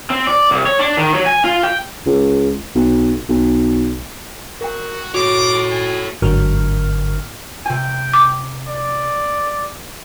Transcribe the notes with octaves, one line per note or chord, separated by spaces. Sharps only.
C4
D5
C2
C#5
D4
D#3
F#3
G#5
F4
G5
C#2
B1
B1
F#4 A#4 G5
F#4 A4 C#5 D6
G#5
G1 G#2 D3 F#3 A#4 F6
C3 G5 G#5
D6
D5